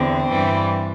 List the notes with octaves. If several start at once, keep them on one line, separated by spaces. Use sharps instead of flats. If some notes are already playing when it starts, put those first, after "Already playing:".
Already playing: E2 D3 C4
G2 E3 G3